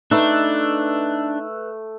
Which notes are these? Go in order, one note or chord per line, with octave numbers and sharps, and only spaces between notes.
A3 D4 D#4 B4 E6 F#6